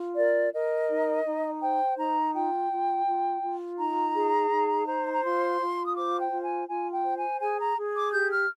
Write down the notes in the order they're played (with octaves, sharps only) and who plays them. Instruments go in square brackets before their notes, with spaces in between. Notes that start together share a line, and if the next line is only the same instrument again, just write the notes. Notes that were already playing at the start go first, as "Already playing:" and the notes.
Already playing: [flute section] F4
A#4 D5
A#4 D#5
D#4
D#4
C5 G5
D#4 A#5
F4 G5
F4
F4
F4
D#4 A#5
G#4
D#4
C5
A#5
F4 C6
F4
D#6
C5 D6
G5
F4
G#5
F4 G#5
G5
C5
G#5
G#4 G#5
A#5
G#4
D6
G4 G6
F6